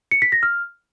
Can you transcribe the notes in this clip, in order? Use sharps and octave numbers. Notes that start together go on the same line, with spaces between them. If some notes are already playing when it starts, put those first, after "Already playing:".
C#7
B6
A#6
F6